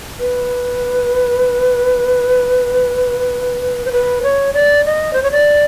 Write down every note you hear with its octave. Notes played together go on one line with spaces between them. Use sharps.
B4
C5
B4
C#5
D5
D#5
C5
C#5
D5